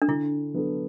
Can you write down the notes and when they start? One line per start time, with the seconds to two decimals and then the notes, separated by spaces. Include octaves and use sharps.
0.02 D4
0.08 D3 E4
0.54 F#3 B3 D4 A4